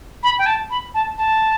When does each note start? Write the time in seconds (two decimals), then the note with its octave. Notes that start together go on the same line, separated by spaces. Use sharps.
0.23 B5
0.39 G5
0.46 A5
0.70 B5
0.94 A5
1.18 A5